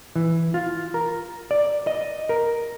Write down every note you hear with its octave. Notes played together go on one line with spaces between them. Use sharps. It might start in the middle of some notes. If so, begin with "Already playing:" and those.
E3
F4
A#4
D5
D#5
A#4